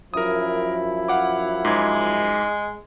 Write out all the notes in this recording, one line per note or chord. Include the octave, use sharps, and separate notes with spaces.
F#2 F3 E4 A#4 D#6
F5 F#5 D6
G#2 G#3 D6 G#6